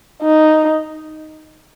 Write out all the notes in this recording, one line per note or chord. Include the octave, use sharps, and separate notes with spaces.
D#4